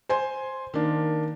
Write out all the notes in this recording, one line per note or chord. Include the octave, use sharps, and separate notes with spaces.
C5 G#5 C6
D#3 A#3 D4